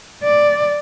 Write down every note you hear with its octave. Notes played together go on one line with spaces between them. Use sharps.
D5